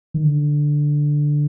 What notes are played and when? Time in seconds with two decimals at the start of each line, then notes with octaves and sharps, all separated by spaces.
0.14 D#3
0.24 D3